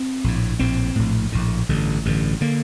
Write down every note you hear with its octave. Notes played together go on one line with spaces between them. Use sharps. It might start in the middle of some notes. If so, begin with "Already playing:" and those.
Already playing: C4
A#1 A2
A#1 A2 C4
A#1 A2
A#1 A2
A1 G2 D3
A1 G2 D3
D3 A#3